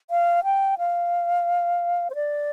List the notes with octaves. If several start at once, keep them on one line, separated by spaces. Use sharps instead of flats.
F5
G5
F5
C5
D5